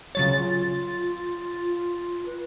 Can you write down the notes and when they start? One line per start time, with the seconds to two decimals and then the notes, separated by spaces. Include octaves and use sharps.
0.15 C#3 F#3 F4 C#5 A6
2.26 B4